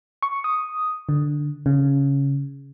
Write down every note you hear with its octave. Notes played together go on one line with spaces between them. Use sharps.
C#6
D#6
D3
C#3